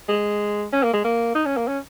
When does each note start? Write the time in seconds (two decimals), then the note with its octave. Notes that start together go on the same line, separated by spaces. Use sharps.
0.09 G#3
0.73 C#4
0.83 A#3
0.93 G#3
1.04 A#3
1.35 D#4
1.46 C#4
1.57 A#3
1.68 C#4